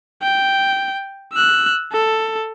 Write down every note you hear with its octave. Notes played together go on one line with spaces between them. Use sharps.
G5
E6 F#6
A4